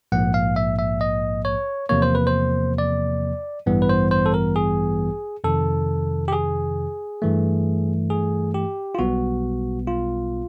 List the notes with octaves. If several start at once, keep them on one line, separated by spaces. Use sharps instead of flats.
A#1 G#2 F3 A#3 F#5
F5
E5
E5
D#5
C#5
E2 C3 F3 A#3 C#5
C5
B4
C5
D5
A1 G2 E3 G3 B3
B4
C5
C5
A4
A#4
G#4
F2 C3 D#3 A4
G4
G#4
G2 E3 A3
G#4
G4
F4
B1 B2 G3 B3 F#4
F4